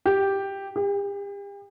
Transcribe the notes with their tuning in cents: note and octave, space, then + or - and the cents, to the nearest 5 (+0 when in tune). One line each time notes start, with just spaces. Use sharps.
G4 +0
G4 +40